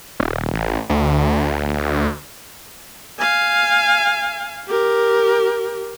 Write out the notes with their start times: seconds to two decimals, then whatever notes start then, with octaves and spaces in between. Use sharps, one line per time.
0.20 D#1
0.53 A1
0.89 D2
3.19 F5 G#5
4.67 G4 A#4